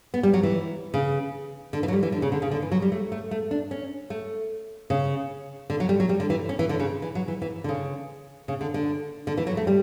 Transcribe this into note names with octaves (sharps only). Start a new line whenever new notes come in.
B3
G3
F#3
E3
C#3
D3
E3
F#3
G3
E3
D3
C#3
D3
C#3
D3
E3
F#3
G3
A3
A3
A3
D4
C#4
A3
C#3
D3
F#3
G3
F#3
G3
D3
E3
C#4
E3
D3
C#3
E3
F#3
E3
E3
D3
C#3
C#3
D3
D3
D3
E3
F#3
A3
G3